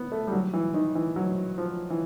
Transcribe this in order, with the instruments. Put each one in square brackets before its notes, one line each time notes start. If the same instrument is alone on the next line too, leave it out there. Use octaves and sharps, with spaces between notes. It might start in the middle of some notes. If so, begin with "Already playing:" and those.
Already playing: [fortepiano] B3
A3
G3
F#3
E3
D#3
E3
F#3
F3
E3